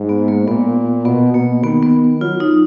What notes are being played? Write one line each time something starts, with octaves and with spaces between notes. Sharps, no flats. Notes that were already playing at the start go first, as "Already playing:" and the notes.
Already playing: G#2
B3
A#3
A#2 B3
B2 B3
B2 A#3
D#3 B3
B3
F#3 F4
D#4